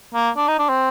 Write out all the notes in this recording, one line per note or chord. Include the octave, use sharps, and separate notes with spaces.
A#3
D4
D#4
D4
C4